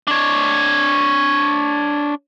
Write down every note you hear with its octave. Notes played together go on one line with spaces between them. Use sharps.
D4 C#5